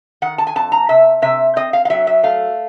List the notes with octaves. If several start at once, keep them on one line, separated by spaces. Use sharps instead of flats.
D#3 F#5
A5
G#5
F2 A5
A#5
C3 E5
C3 E5
C4 D#5
F5
F5
F#3 E5
E5
A3 F5